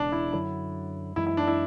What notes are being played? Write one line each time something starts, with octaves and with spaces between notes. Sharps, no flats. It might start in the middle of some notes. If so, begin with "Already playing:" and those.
Already playing: E1 E2 C#3 E3 D4
E4
F#2 D3 F#3 E4
F#2 E3 G#3 E4
E4
D4
E4